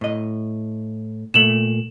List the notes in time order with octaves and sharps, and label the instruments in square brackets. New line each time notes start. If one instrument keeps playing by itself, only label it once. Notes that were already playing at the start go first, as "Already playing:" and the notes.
[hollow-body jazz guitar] A2 D#5
[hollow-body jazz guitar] A#2 A3 [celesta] E7 F#7